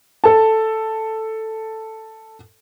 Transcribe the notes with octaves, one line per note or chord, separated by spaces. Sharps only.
A4 A5